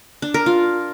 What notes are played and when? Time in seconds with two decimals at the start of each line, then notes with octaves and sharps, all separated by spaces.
0.22 D4
0.34 A#4
0.46 F4